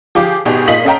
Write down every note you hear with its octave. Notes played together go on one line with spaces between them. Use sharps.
F3 F4 G4 G#4 D6
G#1 B2 D#4 G4 G#4
A#2 F4 D#5 B6 F#7
C#4 A4 D#5 F5 G5 A#5